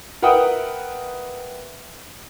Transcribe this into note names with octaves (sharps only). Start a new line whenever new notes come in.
A#4 B4 E5 F#5 G5 D#6